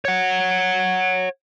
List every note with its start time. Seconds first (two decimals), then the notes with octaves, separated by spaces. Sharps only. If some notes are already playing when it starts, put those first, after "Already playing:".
0.05 C#5 F#5